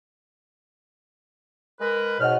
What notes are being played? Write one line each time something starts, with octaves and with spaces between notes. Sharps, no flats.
G#3 A#4 B4
G#2 B2 C#5 D#5 F#5 F6